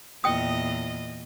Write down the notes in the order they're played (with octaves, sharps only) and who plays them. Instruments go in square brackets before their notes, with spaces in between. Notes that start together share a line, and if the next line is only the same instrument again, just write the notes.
[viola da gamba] E2 A#2 D#5 [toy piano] G5 D#6